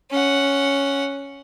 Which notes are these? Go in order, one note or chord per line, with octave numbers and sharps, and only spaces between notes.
C#4 F#5